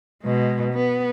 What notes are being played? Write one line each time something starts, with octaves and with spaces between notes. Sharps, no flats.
B2 G#3
B3